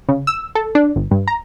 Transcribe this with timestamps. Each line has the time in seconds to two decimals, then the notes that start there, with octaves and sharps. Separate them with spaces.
0.09 C#3
0.27 E6
0.55 A4
0.75 D4
0.96 G1
1.11 G2
1.28 A#5